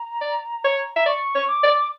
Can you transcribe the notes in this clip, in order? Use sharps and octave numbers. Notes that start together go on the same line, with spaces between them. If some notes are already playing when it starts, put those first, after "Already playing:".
Already playing: A#5
D5
C#5
E5 A#5
D5 C#6
C#5
D6
D5